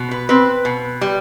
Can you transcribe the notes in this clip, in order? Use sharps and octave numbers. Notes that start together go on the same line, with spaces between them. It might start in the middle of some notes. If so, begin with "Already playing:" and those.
Already playing: B2
B4
C4 B4
B2
G3